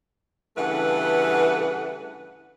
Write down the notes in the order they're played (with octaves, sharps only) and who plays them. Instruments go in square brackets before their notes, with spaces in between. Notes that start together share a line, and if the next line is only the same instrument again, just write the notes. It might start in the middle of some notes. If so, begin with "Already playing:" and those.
[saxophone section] G2 C#3 E3 A3 B4 F#5